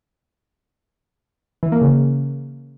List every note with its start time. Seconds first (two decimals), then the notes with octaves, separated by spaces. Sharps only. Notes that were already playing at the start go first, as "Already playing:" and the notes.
1.63 E3
1.72 A#3
1.82 C#3